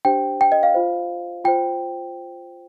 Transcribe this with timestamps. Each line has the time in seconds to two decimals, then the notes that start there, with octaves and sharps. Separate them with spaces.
0.05 D4 G4 C5 G5
0.41 G5
0.52 D#5
0.63 F5
0.74 F4 C5
1.44 F4 C5 G5